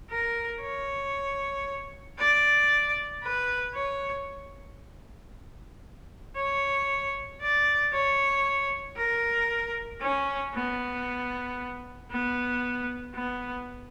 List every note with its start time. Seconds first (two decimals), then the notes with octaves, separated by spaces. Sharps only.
0.10 A#4
0.61 C#5
2.19 D5
3.23 B4
3.75 C#5
6.36 C#5
7.41 D5
7.92 C#5
8.97 A#4
10.01 C#4
10.54 B3
12.11 B3
13.15 B3